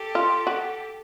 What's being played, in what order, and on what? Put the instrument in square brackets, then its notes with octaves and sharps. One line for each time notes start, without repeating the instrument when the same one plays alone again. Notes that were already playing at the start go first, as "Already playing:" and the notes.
Already playing: [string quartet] G4 A4
[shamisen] F4
F#4